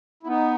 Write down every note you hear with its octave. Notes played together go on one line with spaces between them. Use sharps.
E4
B3 D#4